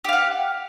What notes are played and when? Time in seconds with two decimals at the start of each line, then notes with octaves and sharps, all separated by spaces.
0.05 G4
0.09 F5
0.13 F#5